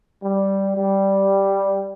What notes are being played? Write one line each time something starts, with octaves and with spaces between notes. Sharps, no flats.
G3
G3